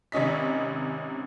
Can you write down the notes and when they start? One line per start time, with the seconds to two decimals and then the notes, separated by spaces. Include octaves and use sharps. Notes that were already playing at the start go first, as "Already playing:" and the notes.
0.12 G#1 C3 C#4 D#5 B6